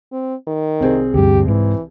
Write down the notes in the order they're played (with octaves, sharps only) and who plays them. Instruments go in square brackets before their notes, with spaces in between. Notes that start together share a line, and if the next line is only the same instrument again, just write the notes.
[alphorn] C4
D#3
[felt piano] C2 C4 G#4
[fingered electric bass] D2 G2 [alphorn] G4
[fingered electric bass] G#2 [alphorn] E3